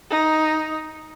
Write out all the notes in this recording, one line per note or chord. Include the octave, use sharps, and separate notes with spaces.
D#4